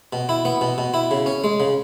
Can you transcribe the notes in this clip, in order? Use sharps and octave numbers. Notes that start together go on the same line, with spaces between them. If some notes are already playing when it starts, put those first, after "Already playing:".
B2
E4
B3
B2
B2
E4
C#3
C#4
G#3
C#3